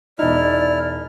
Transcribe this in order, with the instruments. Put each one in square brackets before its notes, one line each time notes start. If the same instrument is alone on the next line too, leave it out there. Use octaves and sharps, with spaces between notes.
[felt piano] E1 D#4 [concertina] E4 F6 [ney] D5